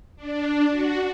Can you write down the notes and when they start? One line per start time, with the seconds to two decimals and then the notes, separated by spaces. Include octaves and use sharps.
0.16 D4
0.68 F#4